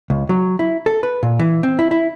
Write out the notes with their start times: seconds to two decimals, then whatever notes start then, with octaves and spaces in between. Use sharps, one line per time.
0.10 C#2
0.29 F#3
0.59 E4
0.86 A4
1.03 B4
1.23 A#2
1.39 E3
1.63 C4
1.79 E4
1.91 E4